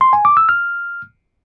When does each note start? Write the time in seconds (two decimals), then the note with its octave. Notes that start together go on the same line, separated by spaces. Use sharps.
0.01 C6
0.13 G#5
0.25 D6
0.37 E6
0.49 F6